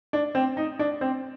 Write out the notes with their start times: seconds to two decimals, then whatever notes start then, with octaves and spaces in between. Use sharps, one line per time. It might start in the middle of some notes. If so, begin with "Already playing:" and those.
0.13 D4
0.35 C4
0.57 D#4
0.79 D4
1.01 C4